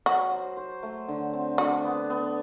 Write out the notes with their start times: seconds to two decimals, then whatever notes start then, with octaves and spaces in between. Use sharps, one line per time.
0.06 F#3 F#4
0.31 C5
0.57 C5
0.83 A3
1.08 D3
1.33 C4
1.58 D4 F#4
1.84 B3
2.10 B3